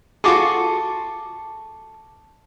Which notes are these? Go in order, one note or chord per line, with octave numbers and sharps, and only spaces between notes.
F4 F#4 G#4 A4 C#6 D6